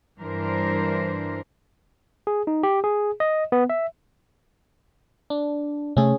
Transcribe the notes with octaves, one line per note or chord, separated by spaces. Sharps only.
G2 E3 D4 A#4 C5
G#4
D#4
G4
G#4
D#5
B3
E5
D4
C3 A3 C#4 G#4